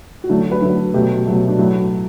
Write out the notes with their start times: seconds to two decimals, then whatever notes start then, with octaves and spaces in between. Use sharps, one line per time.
0.24 F#4
0.29 D3 F#3 A3 E4
0.52 B4
0.62 D3 F#3 A3 A4
0.93 B2 F#3 A3 G4
1.27 B2 F#3 A3
1.48 D4
1.58 A2 F#3 A3 E4